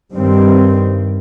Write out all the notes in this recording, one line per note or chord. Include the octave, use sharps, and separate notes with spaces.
G2 D#3 G3 C4